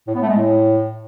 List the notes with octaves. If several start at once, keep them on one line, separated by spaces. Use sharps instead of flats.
A2
B3
A3
G#3
A2